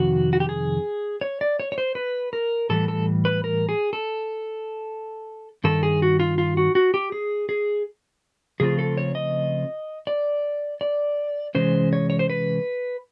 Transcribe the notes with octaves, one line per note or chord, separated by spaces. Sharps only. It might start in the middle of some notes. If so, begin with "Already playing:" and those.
Already playing: F2 C3 D#3 F#4
F#4
G4
G#4
C#5
D5
C#5
C#5
C5
B4
A#4
A2 E3 G3 A4
A4
B4
A#4
G#4
A4
G2 D#3 A4
G#4
F#4
F4
F4
F#4
F#4
G4
G#4
G#4
C#3 F3 A3 C4 F4 G#4
A4
C#5
D#5
D5
D5
C3 E3 G#3 C#4 C5
C#5
C#5
C5
B4